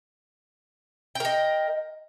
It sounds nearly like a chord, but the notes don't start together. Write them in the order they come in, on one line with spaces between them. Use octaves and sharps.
G5 A#4 D#5